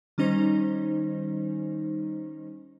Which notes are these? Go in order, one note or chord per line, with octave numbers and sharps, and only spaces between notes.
D#3 G3 C#4 D#4 C5